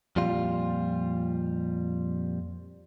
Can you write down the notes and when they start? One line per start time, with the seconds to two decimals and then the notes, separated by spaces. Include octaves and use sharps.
0.16 F2 A#2 G3 F4